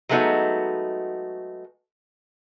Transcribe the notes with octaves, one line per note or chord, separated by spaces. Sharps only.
F#3 G#3 A3 B3 D#4 F#4